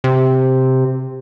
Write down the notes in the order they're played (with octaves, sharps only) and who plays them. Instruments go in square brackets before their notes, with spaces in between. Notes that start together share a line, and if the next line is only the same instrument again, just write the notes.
[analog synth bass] C3